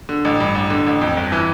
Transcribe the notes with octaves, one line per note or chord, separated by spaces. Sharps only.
D3
A1
G2
A1
D3
A1
F2
G1
E3